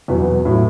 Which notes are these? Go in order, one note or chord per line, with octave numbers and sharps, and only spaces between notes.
E2 B2 F#3 B4
A2 F#3